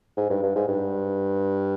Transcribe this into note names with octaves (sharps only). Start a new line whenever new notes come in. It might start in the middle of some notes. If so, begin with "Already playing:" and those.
G#2
G2
G2
G#2
G2